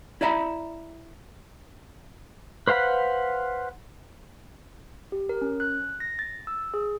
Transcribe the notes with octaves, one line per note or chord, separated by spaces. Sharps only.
E4 D5 E5 A#5 B5
B4 C5 F5 F#5 B5
G4
A#4
C#4
F#6
A#6
A6
E6
G#4